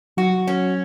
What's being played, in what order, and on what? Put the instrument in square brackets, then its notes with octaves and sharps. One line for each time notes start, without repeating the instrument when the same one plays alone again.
[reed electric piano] F#3 [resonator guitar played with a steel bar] F#4
[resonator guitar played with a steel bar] C#4